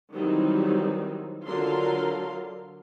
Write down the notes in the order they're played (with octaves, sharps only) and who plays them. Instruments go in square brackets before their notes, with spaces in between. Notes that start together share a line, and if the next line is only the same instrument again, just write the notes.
[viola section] D#3 E3 F#3 G3 C4 D#4
D3 F#3 F4 A#4 F5 C6